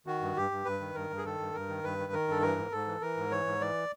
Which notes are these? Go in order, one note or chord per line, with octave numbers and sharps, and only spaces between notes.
D#3 F#4
G2
G2 G4
G2
G2 B4
D#3
G2 A#4
G2
G#4
D#3 A4
G2
G2 A#4
D#3
G2 B4
D#3
D#3 A#4
G2 A4
E3 A#4
G#2
G#2 A4
E3
E3 A#4
G#2
E3 C#5
G#2
E3 D5